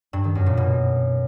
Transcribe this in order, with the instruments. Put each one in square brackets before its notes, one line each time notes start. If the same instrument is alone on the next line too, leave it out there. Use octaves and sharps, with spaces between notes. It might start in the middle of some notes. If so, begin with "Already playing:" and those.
[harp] G2
D#3
F#2
A#2
B2